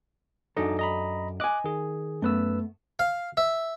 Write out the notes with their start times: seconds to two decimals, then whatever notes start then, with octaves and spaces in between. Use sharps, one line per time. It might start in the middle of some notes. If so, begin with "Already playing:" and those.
0.57 F#2 D4 D#4 A4 D#5
0.79 D#5 A#5 B5
1.40 D#5 G#5 D6 F#6
1.64 D#3 G#4
2.22 F#2 A3 B3 B4 E6
2.99 F5
3.37 E5